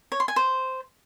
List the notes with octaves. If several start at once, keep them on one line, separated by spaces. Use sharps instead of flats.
C#5
C6
G#5
C5